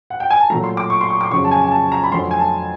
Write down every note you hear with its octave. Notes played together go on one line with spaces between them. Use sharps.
F#5
G5
G#5
A5
A#2 F#3 A3 A#5
C6
D6
C#6
C6
C#6
D6
F2 C#3 F#3 C#6
A5
G#5
G#5
A5
A#5
B5
F2 D3 F#3 A3 C6
G#5
A5